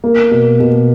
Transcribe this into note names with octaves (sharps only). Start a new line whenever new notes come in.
A#3
B2
B2